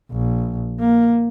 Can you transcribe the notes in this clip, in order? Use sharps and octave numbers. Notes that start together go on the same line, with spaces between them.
A#1
A#3